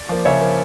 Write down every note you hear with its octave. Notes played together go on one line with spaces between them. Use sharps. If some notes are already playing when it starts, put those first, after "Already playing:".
Already playing: D5
F3 A#3
C#3 C#5 E5
F3 A#3